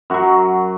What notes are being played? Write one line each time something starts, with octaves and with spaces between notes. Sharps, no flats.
F#2 F#3 F#4